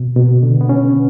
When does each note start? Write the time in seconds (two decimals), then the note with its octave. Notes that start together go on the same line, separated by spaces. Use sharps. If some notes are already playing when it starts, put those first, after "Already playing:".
Already playing: B2
0.16 B2
0.43 D3
0.61 B3
0.69 C#4